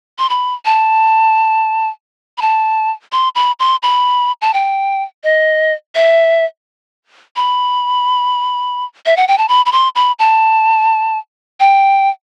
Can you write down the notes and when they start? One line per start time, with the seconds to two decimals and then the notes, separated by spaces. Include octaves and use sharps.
0.19 C6
0.30 B5
0.65 A5
2.38 B5
2.42 A5
3.12 C6
3.35 B5
3.60 C6
3.83 B5
4.42 A5
4.54 G5
5.24 D#5
5.95 E5
7.36 B5
9.06 E5
9.17 F#5
9.28 G5
9.38 A5
9.49 B5
9.66 B5
9.72 C6
9.95 B5
10.19 A5
11.60 G5